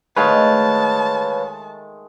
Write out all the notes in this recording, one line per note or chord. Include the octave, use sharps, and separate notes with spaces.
D#3 G#3 A3 B4 C#5 F5 A5